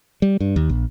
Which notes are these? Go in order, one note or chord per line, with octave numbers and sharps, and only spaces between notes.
G3
G2
D#2
A#1